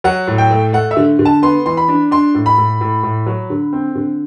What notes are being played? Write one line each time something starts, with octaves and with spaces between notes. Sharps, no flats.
F#3 F#5
A2
G5
A3
A3 F#5
E5
D3
D3
A5
B3 C6
E3 C6
B5
D4
D4 C6
A2
B5
A2
A2
A2
F#3
D3
C4
D3